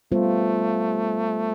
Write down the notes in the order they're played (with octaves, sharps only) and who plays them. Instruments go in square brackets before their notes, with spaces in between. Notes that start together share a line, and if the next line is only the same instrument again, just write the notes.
[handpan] G3 B3 F4 C5 [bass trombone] A3